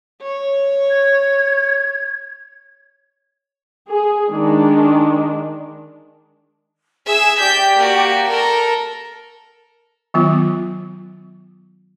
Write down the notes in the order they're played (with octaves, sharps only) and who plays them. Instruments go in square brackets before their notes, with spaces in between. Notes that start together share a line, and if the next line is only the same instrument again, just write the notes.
[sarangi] C#5
[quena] G#6
[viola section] G#4
D#3 G#3 D4
[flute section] G#4 [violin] E5 E6
[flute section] G4 D5 G5 [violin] G6 B6
[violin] A#3 F#4
A4 A#4
[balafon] D#3 F#3 B3 F4